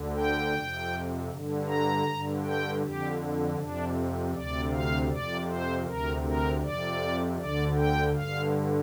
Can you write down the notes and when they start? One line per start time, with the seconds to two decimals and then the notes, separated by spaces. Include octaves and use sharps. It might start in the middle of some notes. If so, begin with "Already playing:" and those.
Already playing: D2 D3
0.16 G5
0.55 F2 C3
1.30 G2 D3
1.68 A#5
2.07 G2 D3
2.44 G5
2.82 F2 D3 G4
3.58 F2 C3 D4
4.34 D2 C3 D5
4.72 F5
5.10 F2 C3 D5
5.48 C5
5.86 D2 C3 A#4
6.25 A#4
6.63 F2 C3 D5
7.38 D2 D3 D5
7.77 G5
8.15 G2 D3 F5